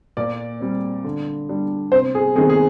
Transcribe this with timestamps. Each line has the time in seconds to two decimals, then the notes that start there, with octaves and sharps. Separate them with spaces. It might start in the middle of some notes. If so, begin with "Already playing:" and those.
0.17 A#2 D5
0.61 G3 C4
1.04 D3
1.49 G3 D4
1.92 C3 C5
2.15 G#4
2.36 D#3 G#3 C4 G#4
2.50 G#4